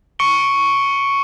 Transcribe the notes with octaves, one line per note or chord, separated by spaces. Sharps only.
C#6 C#7 D7 G7